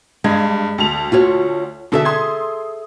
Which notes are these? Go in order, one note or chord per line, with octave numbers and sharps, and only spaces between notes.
G2 G#3 G#6
D2 A5 F7
F4 F#4 C#5
B2 D3 G#4 A4 E5
C6 D#6 G#6